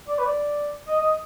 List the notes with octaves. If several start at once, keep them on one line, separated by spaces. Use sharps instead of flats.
D5
B4
D5
D#5
D#5